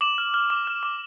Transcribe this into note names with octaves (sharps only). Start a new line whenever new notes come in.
D6 E7 F#7
F6
F6
D6
F6
D6